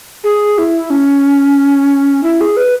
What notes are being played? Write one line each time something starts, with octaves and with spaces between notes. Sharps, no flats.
G#4
E4
C#4
E4
G#4
B4